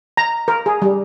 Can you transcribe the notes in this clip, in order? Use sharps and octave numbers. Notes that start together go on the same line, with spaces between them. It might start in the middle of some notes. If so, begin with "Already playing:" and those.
A#5
A#4
G#4
G3